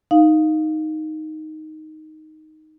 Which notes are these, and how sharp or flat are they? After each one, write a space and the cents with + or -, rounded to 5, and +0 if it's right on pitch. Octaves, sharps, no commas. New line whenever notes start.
D#4 +0 F5 +0